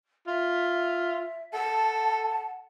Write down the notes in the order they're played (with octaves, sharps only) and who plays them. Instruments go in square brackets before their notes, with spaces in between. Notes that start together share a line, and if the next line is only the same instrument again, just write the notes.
[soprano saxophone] F4 [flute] E5
[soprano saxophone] A4 [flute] F#5 [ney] A5